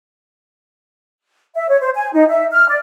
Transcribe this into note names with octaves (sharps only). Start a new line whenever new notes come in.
E5
C#5
C5
G#5
D#4
E5
F6
D5